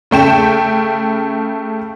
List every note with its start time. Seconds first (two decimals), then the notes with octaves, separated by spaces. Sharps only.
0.11 C#3 A3 G5 E7